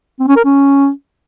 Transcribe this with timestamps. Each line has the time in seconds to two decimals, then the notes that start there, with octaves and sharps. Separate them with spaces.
0.20 C4
0.28 C#4
0.36 A#4
0.45 C#4